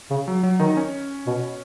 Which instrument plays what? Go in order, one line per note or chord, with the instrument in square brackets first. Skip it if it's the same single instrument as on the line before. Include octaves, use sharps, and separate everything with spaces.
[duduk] C#3
[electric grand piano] F#3
F#3
[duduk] D#3 [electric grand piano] D#4
[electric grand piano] C#4
[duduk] B2